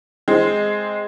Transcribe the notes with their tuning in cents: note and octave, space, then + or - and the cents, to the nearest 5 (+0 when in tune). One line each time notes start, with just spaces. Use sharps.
G#3 +0 C4 +0